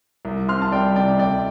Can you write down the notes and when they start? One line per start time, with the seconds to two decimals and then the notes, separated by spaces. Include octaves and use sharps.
0.25 C2
0.48 C4 C6 F6
0.62 A5
0.72 G3 D5 G5
0.96 C3 D5 G5
1.19 D2 D5 G5